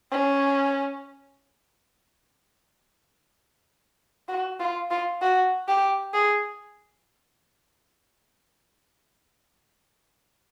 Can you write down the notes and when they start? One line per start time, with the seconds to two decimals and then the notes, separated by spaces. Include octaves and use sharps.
0.12 C#4
4.28 F#4
4.60 F4
4.91 F4
5.22 F#4
5.68 G4
6.14 G#4